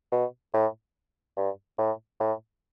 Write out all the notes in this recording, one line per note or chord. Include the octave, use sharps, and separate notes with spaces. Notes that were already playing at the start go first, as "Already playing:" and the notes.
B2
A2
G2
A2
A2